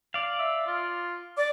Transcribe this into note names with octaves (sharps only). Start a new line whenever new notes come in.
D5 F5
E5
F4
D5 D6